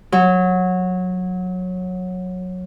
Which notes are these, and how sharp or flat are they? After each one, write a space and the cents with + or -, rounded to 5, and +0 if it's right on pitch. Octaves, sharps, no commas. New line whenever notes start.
F#3 -15